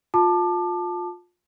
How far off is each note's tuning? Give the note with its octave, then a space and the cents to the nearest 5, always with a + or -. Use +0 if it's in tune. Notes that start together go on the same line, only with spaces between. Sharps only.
F4 +25 A5 +0 D6 +30